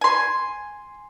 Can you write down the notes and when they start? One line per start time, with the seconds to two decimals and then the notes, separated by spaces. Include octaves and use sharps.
0.01 G#5 C6